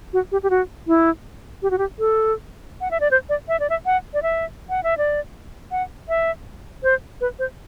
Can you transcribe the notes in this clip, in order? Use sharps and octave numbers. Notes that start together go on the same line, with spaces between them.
F#4
G4
G4
F#4
E4
G4
F#4
G4
A4
F#5
E5
D5
C5
D5
E5
D5
E5
F#5
D5
E5
F#5
E5
D5
F#5
E5
C5
B4
C5